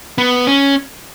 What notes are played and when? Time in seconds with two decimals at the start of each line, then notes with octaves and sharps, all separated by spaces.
0.18 B3
0.47 C#4